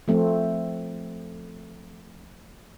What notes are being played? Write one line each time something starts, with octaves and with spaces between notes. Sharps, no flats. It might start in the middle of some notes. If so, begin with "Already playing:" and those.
F3 A3 C4